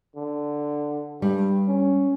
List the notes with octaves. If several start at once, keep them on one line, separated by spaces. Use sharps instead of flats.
D3
G2 G3
C#4